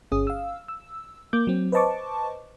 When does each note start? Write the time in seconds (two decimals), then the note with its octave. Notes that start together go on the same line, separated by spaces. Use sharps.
0.12 G1 C#4 G#4 D#6
0.27 F5 E6
0.68 E6
1.33 A#3 D6 G6
1.47 F#3 C4
1.72 B4 C5 D#5 A5 C#6 D6